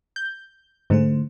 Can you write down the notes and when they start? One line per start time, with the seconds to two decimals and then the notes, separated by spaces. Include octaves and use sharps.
0.16 G6
0.90 G#2 D3 A3 C5